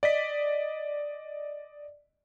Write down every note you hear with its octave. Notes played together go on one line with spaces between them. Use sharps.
D5 D#5 B6